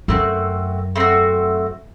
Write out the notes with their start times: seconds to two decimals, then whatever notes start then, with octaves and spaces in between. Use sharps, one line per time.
0.08 F#2 A3 C4 F#4
0.96 A3 C4 F#4